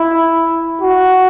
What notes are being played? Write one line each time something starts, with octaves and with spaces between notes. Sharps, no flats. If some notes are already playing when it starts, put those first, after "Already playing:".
Already playing: E4
F#4